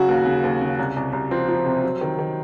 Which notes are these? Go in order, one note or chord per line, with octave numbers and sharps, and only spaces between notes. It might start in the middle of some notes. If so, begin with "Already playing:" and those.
Already playing: C#3 F#3 F#4
D#2
C#3
D#2
C#3
C2
C2
C2
F3 C4
F3
C3
F#3
D#3
D#3